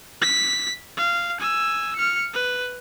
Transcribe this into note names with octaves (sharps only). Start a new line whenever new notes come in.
B6
F5
G#5 E6
F6 C#7
B4